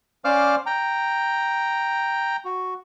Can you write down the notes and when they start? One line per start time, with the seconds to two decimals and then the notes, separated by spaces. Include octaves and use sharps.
0.25 C#4 C5 D5 F5 D6 F6
0.66 G5 A#5
2.45 F#4